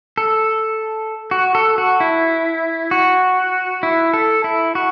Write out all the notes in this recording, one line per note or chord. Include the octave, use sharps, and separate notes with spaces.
A4
F#4
A4
F#4
E4
F#4
E4
A4
E4
F#4